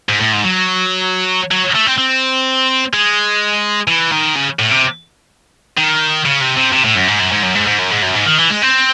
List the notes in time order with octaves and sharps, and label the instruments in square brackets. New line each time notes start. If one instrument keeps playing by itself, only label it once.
[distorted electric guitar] G#2
A2
G#2
F#3
F#3
A3
C4
C4
G#3
E3
D#3
C#3
A2
C3
D#3
C#3
C3
C3
C3
A2
F#2
G#2
F#2
G#2
F#2
G#2
G#2
F#2
G#2
F#2
G#2
D#3
E3
G#3
C4